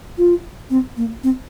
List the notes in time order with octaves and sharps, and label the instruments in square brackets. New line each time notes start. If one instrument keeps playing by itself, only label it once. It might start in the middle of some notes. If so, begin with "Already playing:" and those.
[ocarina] F4
C4
A#3
C4